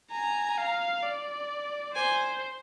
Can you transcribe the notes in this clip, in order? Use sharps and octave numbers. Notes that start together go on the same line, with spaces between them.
G#5 A#5
F5
D5
C5 G#5